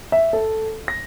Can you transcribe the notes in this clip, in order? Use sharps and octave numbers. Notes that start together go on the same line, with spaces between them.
E5
A4
A#6